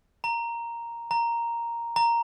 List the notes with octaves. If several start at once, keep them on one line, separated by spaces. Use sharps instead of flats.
A#5
A#5
A#5